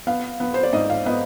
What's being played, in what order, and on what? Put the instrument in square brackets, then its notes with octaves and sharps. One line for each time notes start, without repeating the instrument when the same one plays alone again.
[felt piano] B3 F5
B3
C5
D5
G#2 D#5
F5
B3 D#5